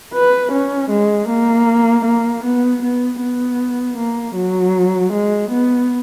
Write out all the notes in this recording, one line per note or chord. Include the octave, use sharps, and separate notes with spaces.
B4
C#4
G#3
A#3
A#3
B3
B3
B3
A#3
F#3
G#3
B3